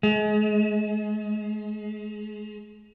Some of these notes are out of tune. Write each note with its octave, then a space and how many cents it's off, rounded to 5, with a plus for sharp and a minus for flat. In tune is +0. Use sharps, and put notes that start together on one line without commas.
G#3 +30